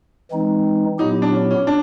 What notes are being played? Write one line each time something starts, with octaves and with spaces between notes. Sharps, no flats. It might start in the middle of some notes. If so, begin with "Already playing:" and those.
E3 G#3 C4 D#4
A#2 F#3 B3 D#4 E4 G4
D4
C#4
C#4
D4